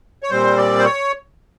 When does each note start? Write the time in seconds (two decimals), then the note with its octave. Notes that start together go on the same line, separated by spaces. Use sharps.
0.23 C#5
0.30 A#2 G3 C4 C5
0.57 D5
0.79 C5
0.84 C#5